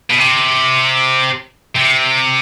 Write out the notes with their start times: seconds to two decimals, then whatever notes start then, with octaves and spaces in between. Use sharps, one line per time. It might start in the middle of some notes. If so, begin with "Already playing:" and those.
0.10 B2
0.19 C3
1.76 C3